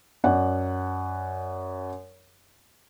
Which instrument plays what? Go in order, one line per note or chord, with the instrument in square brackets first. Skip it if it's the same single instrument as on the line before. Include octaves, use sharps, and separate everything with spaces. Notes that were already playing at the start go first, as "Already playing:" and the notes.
[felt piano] F#2 D5 F#5